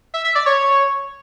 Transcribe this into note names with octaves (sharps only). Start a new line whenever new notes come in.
E5
E5
D5
C#5